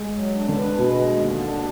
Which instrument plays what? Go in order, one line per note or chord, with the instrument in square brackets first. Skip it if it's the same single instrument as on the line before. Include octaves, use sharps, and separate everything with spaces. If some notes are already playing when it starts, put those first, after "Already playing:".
Already playing: [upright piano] G#3
[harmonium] F#3
D4
[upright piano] D3
[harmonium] B4
[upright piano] B2 [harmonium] G#3
[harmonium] D#2
D3
D4